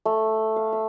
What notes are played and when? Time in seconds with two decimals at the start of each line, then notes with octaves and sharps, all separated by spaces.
0.05 A3
0.56 F5
0.73 E5